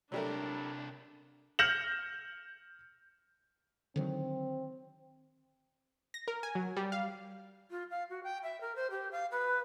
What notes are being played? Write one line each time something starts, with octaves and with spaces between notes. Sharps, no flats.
C3 F#3 G3 A3 D4 A#4
F6 G6 A#6 C#7 E7 F#7
D3 D#3 F#3 C4
A#6
A#4
G#5
F#3
G3
F5
F4
F5
F#4
G5
E5
A#4
C5
G4
F5
B4